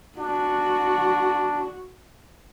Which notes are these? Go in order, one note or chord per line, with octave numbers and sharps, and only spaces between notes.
D4 F#4